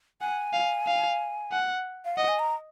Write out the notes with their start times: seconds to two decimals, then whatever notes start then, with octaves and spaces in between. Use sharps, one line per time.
0.21 F#5 G#5
0.53 F5
0.87 F5
1.52 F#5
2.05 F5
2.16 D#5 F#5
2.28 G#5
2.39 A#5